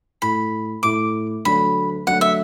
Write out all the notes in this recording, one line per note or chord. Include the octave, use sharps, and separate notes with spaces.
A2 A3 E4 B5
A2 A3 E4 D6
D2 D3 F#3 A3 D4 B5
D2 D3 F#3 A3 D4 F#5
E5